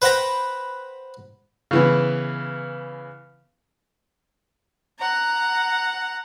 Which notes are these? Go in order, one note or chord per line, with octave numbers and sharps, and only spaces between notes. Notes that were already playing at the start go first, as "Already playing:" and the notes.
B4 C5 F#5 G5 A#5 B5
C#3 E3 B3
F#5 A#5